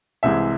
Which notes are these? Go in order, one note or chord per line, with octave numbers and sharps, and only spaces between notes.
C2 C3 E3 G#3 E5